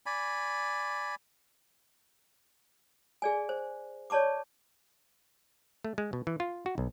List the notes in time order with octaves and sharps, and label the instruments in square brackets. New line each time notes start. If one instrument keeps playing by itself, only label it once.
[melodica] D5 G#5 B5
[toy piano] G#4 D5 G#5
C5
C#5 D5 A5 C#6 D6
[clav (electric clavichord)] A3
G#3
B2
E3
F4
F#4
B1